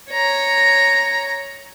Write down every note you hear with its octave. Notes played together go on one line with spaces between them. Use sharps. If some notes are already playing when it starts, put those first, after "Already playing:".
C#5 A#5